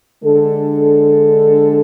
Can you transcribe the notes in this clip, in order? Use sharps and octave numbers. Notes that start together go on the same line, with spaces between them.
D3 G#3 D4 A4